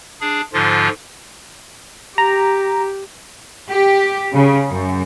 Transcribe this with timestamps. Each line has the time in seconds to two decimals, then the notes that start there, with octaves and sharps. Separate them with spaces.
0.21 D4 G#4
0.53 G#2 D3 F3 F4
2.18 G4 A#5
3.69 G4
4.33 C#3
4.69 F#2